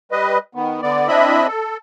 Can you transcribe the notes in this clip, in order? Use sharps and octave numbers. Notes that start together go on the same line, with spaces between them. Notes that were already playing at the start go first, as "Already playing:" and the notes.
G3 B4 D#5
D#3 B3
D3 B3 D5
C4 D4 E4 D#5 E5 B5
A4